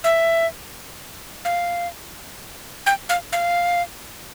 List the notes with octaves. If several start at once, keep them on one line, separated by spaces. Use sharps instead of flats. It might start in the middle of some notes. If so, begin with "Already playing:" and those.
E5
F5
G5
F5
F5